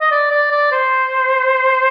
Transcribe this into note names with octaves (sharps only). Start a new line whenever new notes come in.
D#5
D5
D5
D5
C5